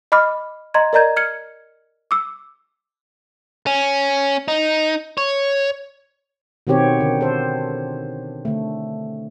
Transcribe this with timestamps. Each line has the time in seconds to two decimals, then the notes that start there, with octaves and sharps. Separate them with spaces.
0.12 D#5 B5 D6 F6
0.74 D#5 A#5 C6 G#6
0.93 A#4 D5 D#5 A#5 G6 G#6
1.17 F6 G#6 C#7
2.11 D6 E6
3.67 C#4
4.48 D#4
5.18 C#5
6.67 B2 D#3 B3 C4 G4 C#5
7.01 D3
7.21 A4 C5
8.45 D3 A3